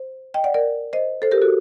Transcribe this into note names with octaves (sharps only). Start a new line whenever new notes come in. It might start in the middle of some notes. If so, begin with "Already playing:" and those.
Already playing: C5
D#5 G5
D5 F#5
A#4 D5
C5 D#5
A4 C5
G4 A#4
F#4 A4